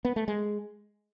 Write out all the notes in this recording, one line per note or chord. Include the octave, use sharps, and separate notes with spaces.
B3
A3
G#3